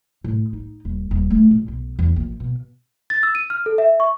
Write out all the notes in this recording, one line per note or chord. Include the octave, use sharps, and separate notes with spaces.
A2
D#4
D#1
D#1
A3
A#2
B1
E2
A#1
B2
A6
E6
D#7
F6
A4
E5
C#6